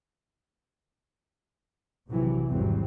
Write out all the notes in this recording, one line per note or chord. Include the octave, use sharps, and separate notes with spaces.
A#1 C3 E3 F#3
G#1 E2 E3 F#3 G3 C4